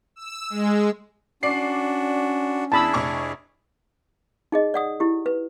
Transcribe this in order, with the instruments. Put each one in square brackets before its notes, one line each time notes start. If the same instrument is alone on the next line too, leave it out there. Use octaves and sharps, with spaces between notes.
[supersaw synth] E6
G#3
[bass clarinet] C#4 [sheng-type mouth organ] D4 F#4 [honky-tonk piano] D5 C7
[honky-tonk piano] E2 [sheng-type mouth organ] D4 E4 G#4 [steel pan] A5 B5 E6
[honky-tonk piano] F1 C#6
[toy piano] D#4 G#4 D#5
D5 F#5 D#6
E4 G4
B4